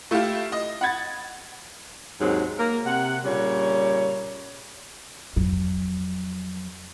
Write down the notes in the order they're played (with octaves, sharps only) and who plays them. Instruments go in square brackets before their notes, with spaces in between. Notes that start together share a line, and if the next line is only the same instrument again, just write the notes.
[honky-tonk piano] A3 E4 F4 G4 F5
D#5
F#5 B5 G#6 A6
[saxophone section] D#2 G#2 F#3 C4 D#4
A#3 A#4
C3 F#5
A#2 C#3 G3 C#5
[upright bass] F2 F#3